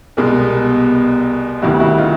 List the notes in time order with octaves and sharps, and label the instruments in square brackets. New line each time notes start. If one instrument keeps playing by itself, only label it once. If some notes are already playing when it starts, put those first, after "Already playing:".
[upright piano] C2 B2 G#3 G#4 A#4
D2 C3 D#3 G3 E4 F#4
E4 F#4
E4
D#4 F4